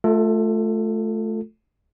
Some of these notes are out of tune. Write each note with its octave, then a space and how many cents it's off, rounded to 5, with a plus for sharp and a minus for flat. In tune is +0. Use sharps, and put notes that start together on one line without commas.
A3 -20 F4 +20 A4 +20